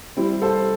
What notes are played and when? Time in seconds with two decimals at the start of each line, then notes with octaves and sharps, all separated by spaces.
0.17 G3 C4 E4
0.42 A4 C5